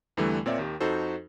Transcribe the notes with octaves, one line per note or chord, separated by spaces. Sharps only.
E2 D3 E3 G3 A3
A#2 C4 A#4 C#5 D5 E5
D#2 D#3 G4
F2 D#4 F#4 A4 C5